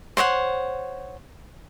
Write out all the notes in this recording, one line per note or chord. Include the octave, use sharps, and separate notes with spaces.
C5 C#5 D#5 F#5